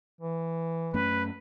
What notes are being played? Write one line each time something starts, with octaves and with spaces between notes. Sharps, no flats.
E3
F#2 A3 C#4 B4